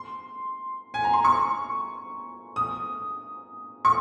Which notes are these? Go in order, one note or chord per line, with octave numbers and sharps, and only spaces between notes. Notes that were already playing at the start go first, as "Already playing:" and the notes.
Already playing: C6
G#5
A#5
C6
C#6
D#6
C#6